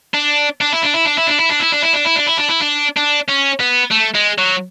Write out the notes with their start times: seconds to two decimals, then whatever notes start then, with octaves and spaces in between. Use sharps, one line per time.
0.14 D4
0.61 D4
0.72 E4
0.83 D4
0.94 E4
1.05 D4
1.17 E4
1.27 D4
1.39 E4
1.50 D4
1.60 E4
1.72 D4
1.83 E4
1.94 D4
2.05 E4
2.16 D4
2.27 E4
2.38 D4
2.49 E4
2.61 D4
2.97 D4
3.29 C#4
3.60 B3
3.91 A3
4.15 G#3
4.38 F#3